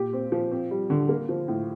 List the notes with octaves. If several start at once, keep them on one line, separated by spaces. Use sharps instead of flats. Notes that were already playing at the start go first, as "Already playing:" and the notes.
Already playing: A#2 G4
C4
F3
C4
G3
D3
A#3
F3
A2